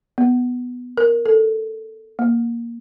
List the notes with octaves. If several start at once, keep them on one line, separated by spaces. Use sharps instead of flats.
B3
A#4
A4
A#3